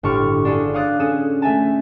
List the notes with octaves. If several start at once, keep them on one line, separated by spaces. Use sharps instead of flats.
G1 A2 A5 C#6 D6 F6
D4 F4 F#4 G#4 A4
C#5 F5 D6 D#6 F#6 A6
C#4 G#4 A4 D#6 E7
A3 E5 G#5 A5